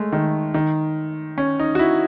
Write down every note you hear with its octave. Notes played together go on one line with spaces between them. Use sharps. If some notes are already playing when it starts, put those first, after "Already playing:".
Already playing: G#3 A3
D#3
D#3
C#4
D#4
F#4
E4